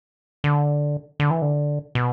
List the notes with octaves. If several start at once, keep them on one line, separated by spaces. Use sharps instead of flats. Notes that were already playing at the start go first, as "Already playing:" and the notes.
D3
D3
E3
D3
B2